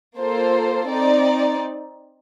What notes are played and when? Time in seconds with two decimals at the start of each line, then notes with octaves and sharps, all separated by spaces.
0.18 A#3 F4 A4 C5
0.89 C4 D#4 D5